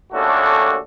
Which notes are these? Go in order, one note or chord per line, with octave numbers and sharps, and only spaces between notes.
D#2 A3 C#4 D4 F#4 A4